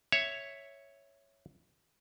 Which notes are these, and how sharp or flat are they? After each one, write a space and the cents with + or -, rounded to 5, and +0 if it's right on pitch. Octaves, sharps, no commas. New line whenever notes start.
C#5 +0 E5 +0